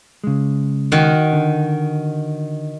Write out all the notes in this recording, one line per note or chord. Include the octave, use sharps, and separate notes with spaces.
C#3 G#3
D#3 F#4
D3